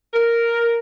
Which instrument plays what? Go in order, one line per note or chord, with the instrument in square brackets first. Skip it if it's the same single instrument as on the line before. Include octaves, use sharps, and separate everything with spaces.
[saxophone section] A#4